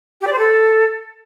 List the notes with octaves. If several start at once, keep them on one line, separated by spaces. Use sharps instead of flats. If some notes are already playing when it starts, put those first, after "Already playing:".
G4
D5
C5
A4